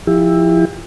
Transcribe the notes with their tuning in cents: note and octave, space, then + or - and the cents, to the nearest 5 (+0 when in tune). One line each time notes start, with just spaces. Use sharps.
F3 +0 E4 +0 G4 +35